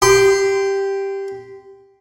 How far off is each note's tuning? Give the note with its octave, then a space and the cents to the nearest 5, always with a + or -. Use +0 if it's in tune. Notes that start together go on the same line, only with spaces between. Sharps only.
G4 +0 C6 -30